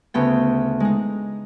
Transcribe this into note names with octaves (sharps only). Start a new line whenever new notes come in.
D2 C#3 B3 G5
G#3 D#4